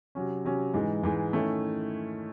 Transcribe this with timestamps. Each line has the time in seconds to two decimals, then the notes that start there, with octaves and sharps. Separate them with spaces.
0.15 C3 F#3 C#4
0.45 C3 F#3 C#4
0.74 G#2 E3 G#3
1.04 G#2 E3 G#3
1.33 D#3 A3 C#4 E4